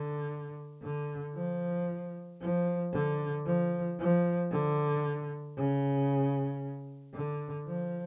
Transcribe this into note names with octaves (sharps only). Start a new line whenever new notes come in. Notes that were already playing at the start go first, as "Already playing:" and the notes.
Already playing: D3
D3
F3
F3
D3
F3
F3
D3
C#3
D3
F3